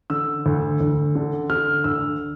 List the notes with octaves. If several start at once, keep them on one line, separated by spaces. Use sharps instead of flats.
D3 E6
D2
D2
D3
D3 F6
D2 E6